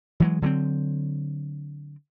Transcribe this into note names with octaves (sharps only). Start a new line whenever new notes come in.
E3 F#3 G#3
D3 F#3 A#3 C4